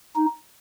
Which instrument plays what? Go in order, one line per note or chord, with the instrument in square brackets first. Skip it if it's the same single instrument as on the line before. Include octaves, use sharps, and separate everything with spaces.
[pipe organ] D#4